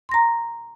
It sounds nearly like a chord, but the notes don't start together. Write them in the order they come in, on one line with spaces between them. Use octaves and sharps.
C6 A#6 A#5